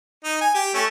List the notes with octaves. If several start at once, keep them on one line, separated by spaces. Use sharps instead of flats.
D#4
G#5
G4
A3 C#4